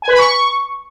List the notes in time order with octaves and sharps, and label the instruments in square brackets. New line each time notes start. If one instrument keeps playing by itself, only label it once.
[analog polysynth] G#5
B4
B5
C#6